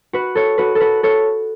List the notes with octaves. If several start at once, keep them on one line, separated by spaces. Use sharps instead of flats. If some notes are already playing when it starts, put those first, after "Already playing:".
F#4 B4
A4 C#5
F#4 B4
A4
F#4 B4
A4 C#5